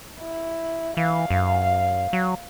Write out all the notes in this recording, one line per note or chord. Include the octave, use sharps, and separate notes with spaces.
E4
E3 F5
F#2
F#3